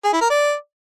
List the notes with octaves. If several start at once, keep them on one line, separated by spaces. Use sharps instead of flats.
G#4
E4
A#4
D5